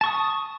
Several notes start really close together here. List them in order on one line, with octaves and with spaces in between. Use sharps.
A5 C#6 D#6